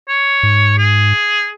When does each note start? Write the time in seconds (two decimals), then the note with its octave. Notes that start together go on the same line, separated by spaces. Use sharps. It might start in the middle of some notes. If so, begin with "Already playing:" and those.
0.08 C#5
0.43 G#2
0.78 G#4